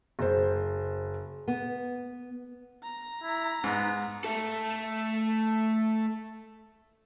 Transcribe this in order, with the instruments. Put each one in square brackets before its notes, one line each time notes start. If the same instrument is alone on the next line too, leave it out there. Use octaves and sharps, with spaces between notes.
[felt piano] F#1 C5
[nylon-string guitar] B3
[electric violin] A#5
[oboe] E4
[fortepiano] G#2 [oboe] B3
[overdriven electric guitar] A3 A4